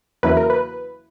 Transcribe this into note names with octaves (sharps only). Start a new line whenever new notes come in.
E2 C#3 F#3 A#3 E4 B4
A#4
B4